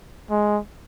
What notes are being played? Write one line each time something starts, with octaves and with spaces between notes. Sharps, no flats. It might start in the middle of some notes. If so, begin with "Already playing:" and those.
G#3